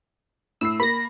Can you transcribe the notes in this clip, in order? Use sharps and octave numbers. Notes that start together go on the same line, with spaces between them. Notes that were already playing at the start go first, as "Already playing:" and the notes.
A2 E6 C7
A#3 B5 A#6